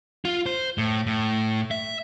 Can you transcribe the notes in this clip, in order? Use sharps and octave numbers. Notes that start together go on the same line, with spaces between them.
F4
C5
A2
A2
E5